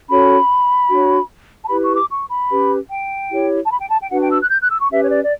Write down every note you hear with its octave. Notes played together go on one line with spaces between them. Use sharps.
C#4 F#4 A4 C#5 B5
D4 F#4 C#5
A5
E4 G4 B4 B5
C#6
D6
C#6
B5
C#4 G4 B4
G5
E4 G4 C#5
A5
B5
G5
A5
G5
D4 F#4 B4 F#5
G5
E6
F#6
G6
F#6
E6
C#6
C#4 G4 B4 E5
C#5
D5
D5